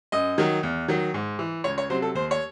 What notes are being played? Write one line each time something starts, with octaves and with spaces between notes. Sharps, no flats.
F#2 D#5
D#3 F#3
E2
D#3 F#3
G#2
E3
C#2 C#5
C#5
C3 F#3 C5
A4
D#2 C5
C#5